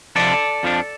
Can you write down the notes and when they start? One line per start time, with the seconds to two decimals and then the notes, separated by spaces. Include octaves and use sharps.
0.16 F2 C3 F3 D4 A4 D5
0.63 F2 F3 D4